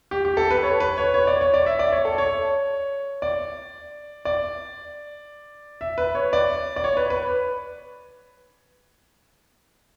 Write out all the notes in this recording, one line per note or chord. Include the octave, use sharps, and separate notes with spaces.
G4
G4
A4
B4
C#5
B4
C#5
C#5
D5
C#5
D5
E5
D5
C#5
A4
C#5
D5
D5
E5
B4
C#5
D5
D5
C#5
B4
B4